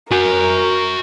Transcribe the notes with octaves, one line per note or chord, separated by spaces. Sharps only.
F#4 A#4 G#5